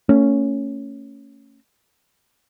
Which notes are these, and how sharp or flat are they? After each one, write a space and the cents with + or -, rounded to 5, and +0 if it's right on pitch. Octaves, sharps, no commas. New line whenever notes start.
A3 +40 C#4 +0